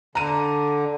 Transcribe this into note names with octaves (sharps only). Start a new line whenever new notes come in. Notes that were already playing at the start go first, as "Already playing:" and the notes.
D3 A#5 D#7